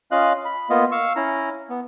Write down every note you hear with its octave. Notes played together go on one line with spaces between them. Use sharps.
C#4 F4 D#5 F5 F#6
B5
A#3 B3 F4 D#5
F5 C#6 E6
C#4 E4 A#5
B3